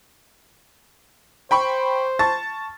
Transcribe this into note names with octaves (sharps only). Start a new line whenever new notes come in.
C5 G5 B5 C#6
A5 C#6 A6